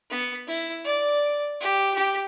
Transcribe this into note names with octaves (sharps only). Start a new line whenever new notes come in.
B3
E4
D5
G4
G4